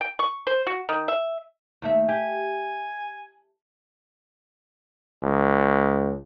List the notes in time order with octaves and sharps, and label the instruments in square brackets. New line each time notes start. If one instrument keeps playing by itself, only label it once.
[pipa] G5
C#6
C5
F#4
D#3
E5
[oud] D#2 A3 E5
[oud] G4 [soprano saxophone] G#5
[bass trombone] C#2